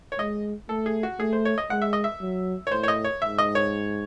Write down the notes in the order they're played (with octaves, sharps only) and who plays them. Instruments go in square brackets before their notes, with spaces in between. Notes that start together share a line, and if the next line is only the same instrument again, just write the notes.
[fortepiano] C#5
[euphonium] G#3 [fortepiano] D#5
[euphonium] A3 [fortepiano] A4
[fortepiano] G#4
F#4
[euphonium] A3 [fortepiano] G#4
[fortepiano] C5
C#5
D#5
[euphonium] G#3 [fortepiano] F#5
[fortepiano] E5
D#5
E5
[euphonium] F#3
[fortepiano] C#5
[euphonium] A2 [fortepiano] C5
[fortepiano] C#5
D#5
C#5
[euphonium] G#2 [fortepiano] E5
[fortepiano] D#5
C#5